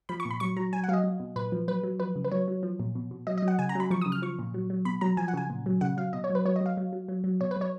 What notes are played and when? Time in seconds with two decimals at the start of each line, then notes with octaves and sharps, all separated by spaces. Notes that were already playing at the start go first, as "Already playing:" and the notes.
0.09 F3 B5
0.20 C#6
0.25 A#2
0.31 B5
0.40 F#3 C#6
0.57 F#3 A#5
0.73 F#3 G#5
0.84 F#5
0.89 F#3 F5
0.93 D#5
1.04 F#3
1.20 B2
1.36 A#2 B4
1.52 F3
1.68 F#3 B4
1.83 F#3
2.00 F3 B4
2.16 C#3
2.25 B4
2.31 F#3 C#5
2.48 F#3
2.63 F3
2.80 A#2
2.95 B2
3.11 B2
3.27 F#3 D#5
3.38 D#5
3.42 F#3
3.48 F#5
3.59 C#3 G#5
3.69 A#5
3.75 F#3 B5
3.90 F3 C#6
4.01 D#6
4.06 C#3
4.12 F6
4.22 F3 C#6
4.39 A#2
4.54 F#3
4.70 F#3
4.85 B2 B5
5.01 F#3 A#5
5.17 F3 G#5
5.28 F#5
5.34 C#3 G#5
5.50 A#2
5.66 F#3
5.81 C#3 F#5
5.97 F#3 F5
6.13 B2 D#5
6.24 C#5
6.30 F#3
6.35 B4
6.45 F#3 C#5
6.56 D#5
6.61 F#3 F5
6.77 F#3
6.93 F#3
7.08 F#3
7.24 F#3
7.41 B2 C#5
7.51 B4
7.56 F#3 C#5